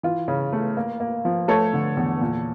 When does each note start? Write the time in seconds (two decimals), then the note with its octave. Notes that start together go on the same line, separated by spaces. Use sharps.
0.03 E3 F4
0.28 C#3
0.53 A3
0.77 A#3
1.00 A#3
1.25 F3
1.48 A3 A4 C#5
1.73 D3
1.97 E2
2.21 A#2